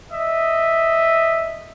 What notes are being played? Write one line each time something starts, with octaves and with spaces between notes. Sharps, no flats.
D#5 E5